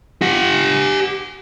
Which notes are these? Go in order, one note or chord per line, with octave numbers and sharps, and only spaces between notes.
G4 F#5